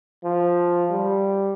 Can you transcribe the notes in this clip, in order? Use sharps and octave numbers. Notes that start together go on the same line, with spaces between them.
F3
G3